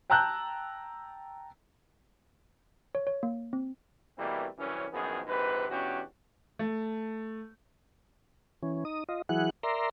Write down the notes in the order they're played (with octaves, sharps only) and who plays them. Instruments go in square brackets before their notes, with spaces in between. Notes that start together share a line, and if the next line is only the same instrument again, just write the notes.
[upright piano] G5 A5 A#5 E6 F#6 G6
[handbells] C#5
C#5
A#3
C4
[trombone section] B2 E3 G3 A3 A#3 C4
C2 F#2 E3 C#4
A#1 F#2 D#3 F3 B3 G#4
A#1 G#2 C3 B4
E2 B2 C#4 D4 F#4 G4
[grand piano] A3
[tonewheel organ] E3 C#4
D#4 D#6
F4 D#5
E3 F#3 E4 G#4 F#5 F#6
A#4 D5 E5 A#5 C6